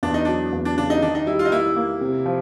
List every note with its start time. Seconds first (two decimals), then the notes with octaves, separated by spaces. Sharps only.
0.03 E2 D4
0.14 D#4
0.25 F#3 D4
0.53 E2
0.65 D4
0.77 C#3 D4
0.90 D#4
1.02 D#3 D4
1.15 D#4
1.26 G3 E4
1.39 F4
1.45 D#4
1.52 A#3 E4
1.76 A#3
2.01 C3
2.26 F3